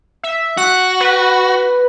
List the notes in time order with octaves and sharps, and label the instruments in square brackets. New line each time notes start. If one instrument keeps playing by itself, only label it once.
[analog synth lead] E5
[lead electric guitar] F#4 [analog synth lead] F#6
[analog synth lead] B4